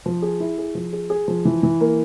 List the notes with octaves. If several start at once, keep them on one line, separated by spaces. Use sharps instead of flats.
F3
G#4
E4
G#4
F3
G#4
G#4
F3
E3
E3
A#3